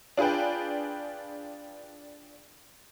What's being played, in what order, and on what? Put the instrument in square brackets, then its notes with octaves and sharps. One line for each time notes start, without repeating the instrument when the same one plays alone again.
[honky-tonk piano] D4 F4 G#4 B4 G5